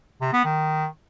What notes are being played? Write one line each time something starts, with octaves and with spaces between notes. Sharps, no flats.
C3
B3
D#3